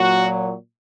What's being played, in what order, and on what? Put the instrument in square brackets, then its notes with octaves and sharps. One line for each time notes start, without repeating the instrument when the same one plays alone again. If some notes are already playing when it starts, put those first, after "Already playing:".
Already playing: [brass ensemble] A#2 F#3 F#4